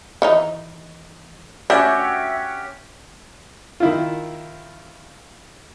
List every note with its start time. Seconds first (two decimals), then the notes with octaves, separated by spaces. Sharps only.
0.22 D#3 E3 D#4
1.70 C#4 D4 F#4 G4 E5 F#5 E6
3.80 D#3 E4 F4